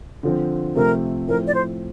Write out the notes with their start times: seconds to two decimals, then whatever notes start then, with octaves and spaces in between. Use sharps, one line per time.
0.23 D3 F3 C4
0.75 C3 F3 A3 A#4
1.28 A2 F3 A3 C4 A#4
1.47 D5
1.54 C5